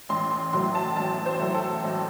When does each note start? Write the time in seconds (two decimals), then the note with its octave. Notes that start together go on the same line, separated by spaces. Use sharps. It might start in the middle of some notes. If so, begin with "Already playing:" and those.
0.09 A1 C6
0.31 C6
0.53 A2 F#3 A3 C6
0.75 A5
0.96 A1 A5
1.26 C5
1.40 A2 F#3 A3
1.54 A4
1.84 A1